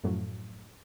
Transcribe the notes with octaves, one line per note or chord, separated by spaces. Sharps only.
F#2 A2 F3 F#3